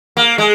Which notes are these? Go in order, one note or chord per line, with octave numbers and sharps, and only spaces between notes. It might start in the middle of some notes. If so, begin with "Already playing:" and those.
A#3
G#3